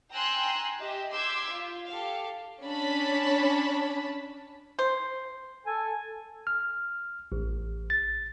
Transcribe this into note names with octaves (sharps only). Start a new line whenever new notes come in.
G5 G#5 A#5 C6 E6 F#6
G4 D#5 E5
C6 D6 E6 G6 G#6 B6
F4
G4 A4 F5
C#4 D4 A5 B5
C5
A4 G#5
F6
A1
A6